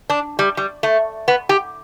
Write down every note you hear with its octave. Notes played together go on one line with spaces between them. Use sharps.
D4
G3
G3
A3
B3
G4